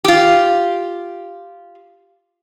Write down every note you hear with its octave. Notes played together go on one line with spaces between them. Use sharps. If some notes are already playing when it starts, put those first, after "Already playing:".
F4 G4